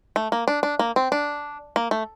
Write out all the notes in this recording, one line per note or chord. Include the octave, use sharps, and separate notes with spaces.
A3
A#3
D4
D4
A#3
C4
D4
A#3
A3